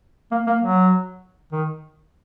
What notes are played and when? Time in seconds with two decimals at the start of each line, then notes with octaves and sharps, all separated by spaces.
0.31 A#3
0.46 A#3
0.61 F#3
1.52 D#3